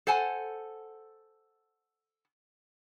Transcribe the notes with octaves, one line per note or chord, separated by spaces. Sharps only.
A4 C5 F#5 G#5 A5